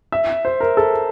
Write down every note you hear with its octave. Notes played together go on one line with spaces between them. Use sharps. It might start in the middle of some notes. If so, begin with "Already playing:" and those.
E5
C5
A#4
A4